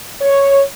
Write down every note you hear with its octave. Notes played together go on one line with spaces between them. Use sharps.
C#5